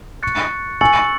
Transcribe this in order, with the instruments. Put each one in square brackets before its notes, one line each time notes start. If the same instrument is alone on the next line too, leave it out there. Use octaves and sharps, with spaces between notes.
[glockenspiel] C#6 F#6 A6 C#7
[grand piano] G#5 [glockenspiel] C#6 E6 A6 C#7 F#7